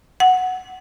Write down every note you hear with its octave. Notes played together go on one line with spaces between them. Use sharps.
F#5